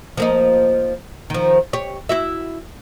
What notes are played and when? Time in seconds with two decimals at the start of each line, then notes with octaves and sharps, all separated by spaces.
0.17 F3 A#3 D#4
1.30 D#3 F3
1.73 G4 C#5
2.09 E4 F#4 E5